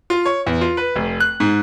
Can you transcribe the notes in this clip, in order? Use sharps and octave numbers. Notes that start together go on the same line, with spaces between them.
F4
C#5
E2
F4
B4
F1
F#6
G#2